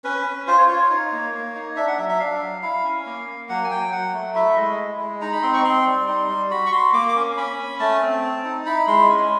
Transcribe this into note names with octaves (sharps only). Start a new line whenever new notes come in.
C#4 B4
C#4
F4 C5
C#5
F4 C#5
C#5
D#4
A#3
A#3
D#4
D4 E5
F#5
F#3 E5
E5
D4 F5
F#3
E4 F5
C#4
A#3
A#3
F#3 F#5
G#5
F#3 G5
F#3 F#5
A3
E4 E5
G#3 D#5
E4
G#3
D#4 A#5
B5
C4 C6
C#6
C4 C6
G3
D#4
G3
F#4 B5
C#6
F#4 C6
A#3 D6
D6
C#4
C#4 B5
C#4
A3 A5
C4
C4
D#4
E4 B5
G#3 C6
C#4